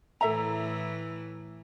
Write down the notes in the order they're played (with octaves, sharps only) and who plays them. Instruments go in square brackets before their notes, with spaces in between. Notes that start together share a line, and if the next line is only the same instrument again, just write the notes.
[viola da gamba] A2 E3 [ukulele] A4 E5 A#5